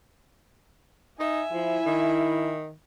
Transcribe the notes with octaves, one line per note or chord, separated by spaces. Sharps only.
D#4 E5 G#5
F3 E4
D#3